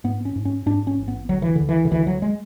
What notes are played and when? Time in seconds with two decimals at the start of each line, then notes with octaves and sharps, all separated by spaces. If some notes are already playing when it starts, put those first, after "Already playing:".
0.04 G#2 B3
0.25 C#4
0.36 G#2
0.45 C#4
0.66 G#2 D4
0.87 C#4
0.98 A1
1.08 B3
1.29 D2 F#3
1.42 E3
1.55 D2 D3
1.69 E3
1.85 D3
1.91 D2 E3
2.07 F#3
2.22 G#3